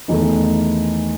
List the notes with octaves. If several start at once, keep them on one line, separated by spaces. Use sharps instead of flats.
E2 D#3 A3 D#4